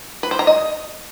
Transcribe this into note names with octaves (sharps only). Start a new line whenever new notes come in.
B4
C5
A#5
D#5